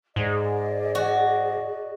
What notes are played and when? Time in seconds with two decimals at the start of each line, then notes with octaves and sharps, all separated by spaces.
0.16 G#2 G#4 D5 D#5
0.95 F#4